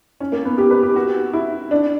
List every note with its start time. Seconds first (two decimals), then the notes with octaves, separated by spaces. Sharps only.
0.20 C#4
0.32 A#3
0.45 B3
0.58 G4
0.71 B4
0.83 G4
0.96 F#4
1.33 E4
1.71 D4